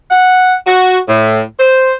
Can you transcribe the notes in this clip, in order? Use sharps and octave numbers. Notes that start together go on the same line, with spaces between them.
F#5
F#4
A2
C5